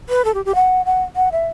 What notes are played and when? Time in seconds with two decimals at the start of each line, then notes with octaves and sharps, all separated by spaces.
0.09 B4
0.25 A4
0.34 G4
0.45 G4
0.55 F#5
0.86 F#5
1.16 F#5
1.32 E5